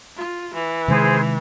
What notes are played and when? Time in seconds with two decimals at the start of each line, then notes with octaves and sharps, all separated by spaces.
0.16 F4
0.54 E3
0.88 C3 D#3 G#3 G#4 C5